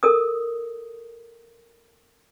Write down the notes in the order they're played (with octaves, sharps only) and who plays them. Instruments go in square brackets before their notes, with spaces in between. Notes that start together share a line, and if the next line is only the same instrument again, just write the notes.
[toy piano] A4 A#4 D#6